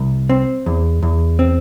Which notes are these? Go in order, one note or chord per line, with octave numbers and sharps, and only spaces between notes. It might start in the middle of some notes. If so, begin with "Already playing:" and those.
Already playing: C2
C4
E2
E2
C4